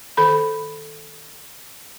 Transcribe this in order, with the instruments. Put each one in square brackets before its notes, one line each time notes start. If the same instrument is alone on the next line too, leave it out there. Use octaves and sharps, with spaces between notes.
[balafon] D#3 A4 B5